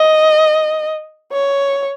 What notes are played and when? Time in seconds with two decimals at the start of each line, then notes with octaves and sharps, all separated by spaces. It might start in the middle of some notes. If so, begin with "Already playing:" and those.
Already playing: D#5
1.32 C#5